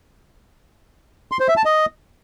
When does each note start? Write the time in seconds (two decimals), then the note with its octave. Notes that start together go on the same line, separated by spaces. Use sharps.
1.32 C6
1.40 C5
1.48 E5
1.57 A5
1.65 D#5